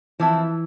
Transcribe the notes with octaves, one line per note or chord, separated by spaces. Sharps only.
E3 F3 C4 E4